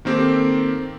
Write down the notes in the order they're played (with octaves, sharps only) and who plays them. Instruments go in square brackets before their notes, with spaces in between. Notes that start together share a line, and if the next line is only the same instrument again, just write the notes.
[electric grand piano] D#3 A#3 C4 G4 A4